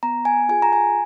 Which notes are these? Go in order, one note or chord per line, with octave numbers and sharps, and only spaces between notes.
B3 A#5
G#5
F4 G#4 G#5
A#5
G#5